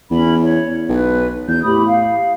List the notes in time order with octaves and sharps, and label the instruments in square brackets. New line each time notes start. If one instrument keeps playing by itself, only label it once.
[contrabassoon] E2 [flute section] C#4 E4 B5
[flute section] C#5
[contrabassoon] B1 [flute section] B4
[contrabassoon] E2 [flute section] G6
[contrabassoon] A2 [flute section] G4 B5 D#6
[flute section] F5